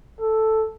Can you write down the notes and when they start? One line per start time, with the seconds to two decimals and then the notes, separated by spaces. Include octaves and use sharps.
0.21 A4